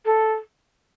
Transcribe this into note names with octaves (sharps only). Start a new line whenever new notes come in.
A4